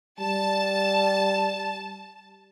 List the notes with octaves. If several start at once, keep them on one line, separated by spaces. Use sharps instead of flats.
G3 A5